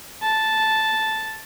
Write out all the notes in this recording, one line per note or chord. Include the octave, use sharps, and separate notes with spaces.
A5